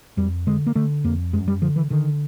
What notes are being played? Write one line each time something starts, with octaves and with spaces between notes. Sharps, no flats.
F2 G3
D3 G#3
A#3
D3 A3
F2 A#3
F#2 G#3
G3
D3 F3
E3
D3 D#3